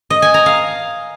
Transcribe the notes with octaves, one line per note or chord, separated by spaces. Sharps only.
D#5
G#5
A#5
F5